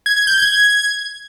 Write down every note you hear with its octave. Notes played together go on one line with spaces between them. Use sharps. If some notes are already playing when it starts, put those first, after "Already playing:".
G#6
G#6
G6
G#6